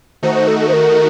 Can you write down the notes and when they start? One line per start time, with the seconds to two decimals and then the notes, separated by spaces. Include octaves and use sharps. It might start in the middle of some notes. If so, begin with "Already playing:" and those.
0.23 D#3 A3 D#4 F#4 C5
0.35 C5
0.48 A4
0.60 A4
0.68 C5
0.73 A#4